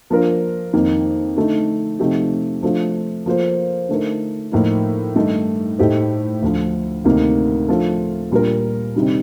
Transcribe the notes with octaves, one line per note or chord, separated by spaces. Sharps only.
F3 A#3 D4 F4 A#4
F2 D#3 A#3
D3 A3 D#4
C3 F3 A3 D#4 G4
F3 A3 D4 F4
F3 A#3 F4 A4 C5
D3 A3 D#4 A#4
A2 F3 A#3 D#4
G2 D#3 A3 D#4
A2 A3 D#4 G4 C5
D2 D3 F3
D2 C3 D#3 A#3
F3 A3 D4 F4 A4
A#2 G3 D4 F4 A#4
C3 D#3 G3 D4